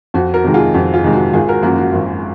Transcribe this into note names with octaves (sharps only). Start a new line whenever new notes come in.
F2 F#4
F#4 A#4
C3 D#3 G#3
F4 G#4
F2 F#4
F4 G#4
C3 D#3 G#3
F#4
G#1 F4 G#4
F#4 A#4
F#2 F3 A#3 F#4
F#4
G#1